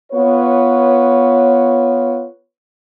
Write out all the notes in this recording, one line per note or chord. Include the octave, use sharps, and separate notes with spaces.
B3 F4 B4 C#5